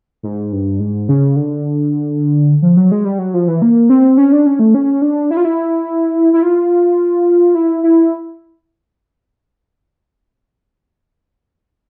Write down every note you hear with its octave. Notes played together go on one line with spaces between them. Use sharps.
G#2
G2
G#2
C#3
D3
F3
F#3
G#3
G3
F#3
F3
E3
A#3
C4
C#4
D4
C#4
A3
C#4
D4
E4
F4
E4
E4
F4
E4
E4